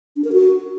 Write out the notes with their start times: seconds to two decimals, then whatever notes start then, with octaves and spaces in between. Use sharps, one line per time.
0.16 D4
0.24 A#4
0.32 F#4